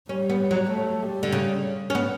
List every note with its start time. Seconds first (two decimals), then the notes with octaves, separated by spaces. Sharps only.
0.09 G3 C#4
0.30 B3
0.51 F#3
0.71 A3
1.02 G3
1.23 D3
1.33 C#3
1.90 C#4
1.95 B3